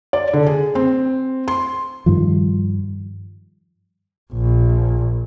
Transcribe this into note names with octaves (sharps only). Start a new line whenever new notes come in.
D5
D3
G#4
C4
C6
G2 D#3 F3
A#1